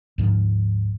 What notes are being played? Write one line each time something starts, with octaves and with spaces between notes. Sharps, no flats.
D2 G#2 F3